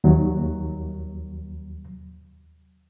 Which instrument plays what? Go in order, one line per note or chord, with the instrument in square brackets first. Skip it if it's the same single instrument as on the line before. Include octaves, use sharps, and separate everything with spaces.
[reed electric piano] D#2 F#3